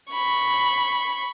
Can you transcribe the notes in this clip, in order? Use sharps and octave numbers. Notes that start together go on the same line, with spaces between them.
B5 C#6